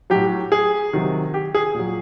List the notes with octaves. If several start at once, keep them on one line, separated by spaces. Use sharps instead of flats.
A2 F#3 G4
G#4
C3 D#3 F#3
G4
G#4
A#2
F#3